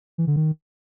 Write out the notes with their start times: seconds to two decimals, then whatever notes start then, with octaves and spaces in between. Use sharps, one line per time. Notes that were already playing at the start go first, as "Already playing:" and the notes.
0.18 E3
0.27 D3
0.36 D#3